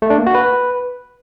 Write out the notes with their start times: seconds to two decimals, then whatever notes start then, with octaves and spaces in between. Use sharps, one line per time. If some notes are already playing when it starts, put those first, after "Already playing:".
0.02 A3
0.10 D4
0.18 A#3
0.27 F#4
0.35 B4